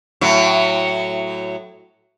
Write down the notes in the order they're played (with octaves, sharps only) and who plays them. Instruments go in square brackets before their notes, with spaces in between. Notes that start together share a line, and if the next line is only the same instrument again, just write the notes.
[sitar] A2 F#3